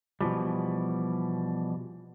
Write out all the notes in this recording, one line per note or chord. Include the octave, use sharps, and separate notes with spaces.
B2 E3 F3 G3